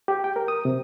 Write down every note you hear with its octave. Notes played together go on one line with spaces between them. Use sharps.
G4
G5
A#4
D#6
C3